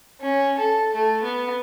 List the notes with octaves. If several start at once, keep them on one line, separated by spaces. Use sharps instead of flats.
C#4
A4
A3
B3